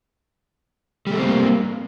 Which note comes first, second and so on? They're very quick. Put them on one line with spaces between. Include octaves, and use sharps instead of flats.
G3 A3 C4 A#3